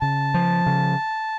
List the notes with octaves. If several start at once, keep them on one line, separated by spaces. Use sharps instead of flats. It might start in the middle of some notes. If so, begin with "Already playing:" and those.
C#3 A5
F3
C#3